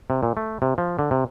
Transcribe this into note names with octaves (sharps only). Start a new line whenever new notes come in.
C3
A#2
A3
C3
F3
D3
C3